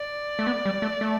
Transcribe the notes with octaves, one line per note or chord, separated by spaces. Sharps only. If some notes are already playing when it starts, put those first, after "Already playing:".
Already playing: D5
A3
B3
G3
A3
A3